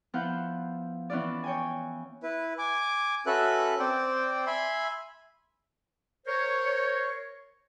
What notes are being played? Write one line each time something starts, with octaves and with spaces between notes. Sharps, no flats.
F3 B3 E4 F5 F#5 G6
E3 B3 C#4 E4 F4 D5
C#5 G5 G#5
E4 B4
G#5 D6
C#4 F#4 A4 B4 E5 F#6
C4 C5 D5 G5
E5 G#5 B5 C6
A#4 C5 C#5